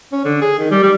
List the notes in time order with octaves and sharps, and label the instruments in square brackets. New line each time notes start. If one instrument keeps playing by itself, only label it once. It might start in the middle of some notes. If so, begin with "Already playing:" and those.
[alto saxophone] C#4
D3
G#4
D#3
G3
G3